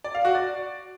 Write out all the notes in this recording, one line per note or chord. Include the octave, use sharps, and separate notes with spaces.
D5
F5
F#4
D5